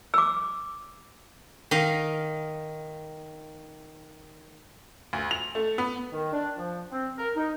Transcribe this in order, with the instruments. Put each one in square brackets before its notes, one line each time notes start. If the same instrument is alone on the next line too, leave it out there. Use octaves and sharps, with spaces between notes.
[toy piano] D6 E6
[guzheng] D#3 D#5 F5
[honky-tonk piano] D2
F7
A3
B3
[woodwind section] D#3
D4
F3
C4
A#4
D#4